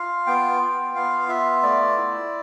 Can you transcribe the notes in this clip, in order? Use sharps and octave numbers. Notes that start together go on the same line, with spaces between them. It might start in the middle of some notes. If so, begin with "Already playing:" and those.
Already playing: F4 F5
B3 G5
F4
B3 F5
F4 E5
A3 D5
E4